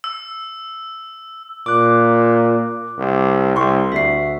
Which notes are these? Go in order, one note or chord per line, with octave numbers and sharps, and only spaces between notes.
E6
A#2 D6 F#6
C2
C2 C6 C#6
D2 E5 C7